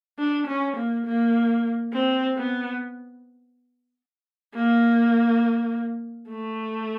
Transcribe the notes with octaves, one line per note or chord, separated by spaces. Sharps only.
D4
C#4
A#3
A#3
C4
B3
A#3
A3